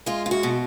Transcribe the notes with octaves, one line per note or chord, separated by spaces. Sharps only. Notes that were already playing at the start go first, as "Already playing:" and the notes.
G#3 F4
F4
F#4
B2